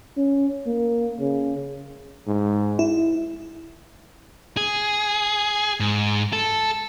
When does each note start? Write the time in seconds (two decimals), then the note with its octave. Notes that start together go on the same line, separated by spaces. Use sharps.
0.17 C#4
0.67 A#3
1.20 C#3
2.28 G#2
2.79 E4
4.57 G#4
5.80 G#2
6.33 A4